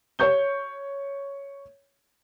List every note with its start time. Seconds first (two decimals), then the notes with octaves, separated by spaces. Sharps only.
0.19 C#5 C#6 G6 G7